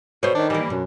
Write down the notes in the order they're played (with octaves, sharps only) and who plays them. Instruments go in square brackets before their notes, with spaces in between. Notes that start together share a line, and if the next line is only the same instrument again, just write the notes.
[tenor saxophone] B2 [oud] C5 C#5
[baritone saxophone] D#3 [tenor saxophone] D4
[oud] E3 A#3 [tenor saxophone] G3
[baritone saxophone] F#2 [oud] B2